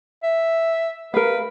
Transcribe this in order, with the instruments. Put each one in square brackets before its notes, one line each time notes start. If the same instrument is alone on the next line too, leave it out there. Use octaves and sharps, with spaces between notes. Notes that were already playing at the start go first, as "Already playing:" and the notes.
[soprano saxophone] E5
[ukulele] A#4 F5 [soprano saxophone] B4